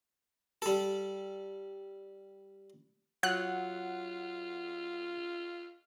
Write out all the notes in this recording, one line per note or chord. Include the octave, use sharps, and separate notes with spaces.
G3 A4
F#3 F4 F#5 F#6